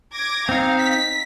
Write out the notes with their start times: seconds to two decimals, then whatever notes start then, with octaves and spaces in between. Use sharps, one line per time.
0.13 D6 G#6 A#6
0.49 C4 D#4 F5
0.79 B6